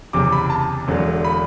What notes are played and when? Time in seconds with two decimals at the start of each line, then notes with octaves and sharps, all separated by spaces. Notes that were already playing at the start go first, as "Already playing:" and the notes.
0.13 F#1 E2 C3 D6
0.32 B5
0.50 A5
0.88 E1 E2 D3 F#3
1.25 B5